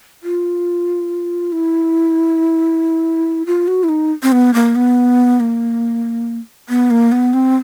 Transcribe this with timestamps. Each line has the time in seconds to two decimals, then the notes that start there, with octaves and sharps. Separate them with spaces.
0.23 F4
1.52 E4
3.46 F4
3.68 F#4
3.84 E4
3.89 D#4
4.23 C4
4.32 B3
4.54 A#3
4.76 B3
5.40 A#3
6.69 B3
6.91 A#3
7.12 B3
7.34 C4